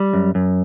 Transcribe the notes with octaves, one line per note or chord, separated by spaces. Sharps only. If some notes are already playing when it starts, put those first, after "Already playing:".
Already playing: G3
F#2
F#2